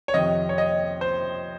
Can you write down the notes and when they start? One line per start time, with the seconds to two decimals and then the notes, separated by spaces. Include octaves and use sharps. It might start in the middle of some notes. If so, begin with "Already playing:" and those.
0.08 C#5
0.14 F2 C3 D#3 D#5
0.49 C#5
0.58 D#5
1.01 C5